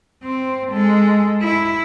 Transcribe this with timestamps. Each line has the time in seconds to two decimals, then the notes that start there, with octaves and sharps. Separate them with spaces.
0.24 C4
0.70 G#3 A4
1.42 E4